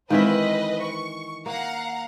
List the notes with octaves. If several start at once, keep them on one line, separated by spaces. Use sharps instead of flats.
D#3 E3 G#3 C4 B4 C5 D#5 E5
C#6
A#3 F5 F#5 A#5